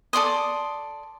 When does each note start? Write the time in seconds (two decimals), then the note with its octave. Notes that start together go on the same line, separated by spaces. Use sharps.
0.13 A4 D5 C6 D#6